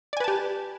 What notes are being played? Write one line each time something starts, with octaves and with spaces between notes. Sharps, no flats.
G4 B4 D5 G#5 A5